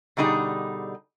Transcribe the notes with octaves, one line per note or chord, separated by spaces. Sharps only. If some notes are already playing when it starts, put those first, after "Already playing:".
B2 D3 G3 D#4 G#4